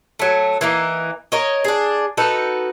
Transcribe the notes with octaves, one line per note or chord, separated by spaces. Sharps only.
F#3 A3
E3 A#3 D#4
A#4 C#5 D#5
D4 G#4
D#4 F#4 A4 B4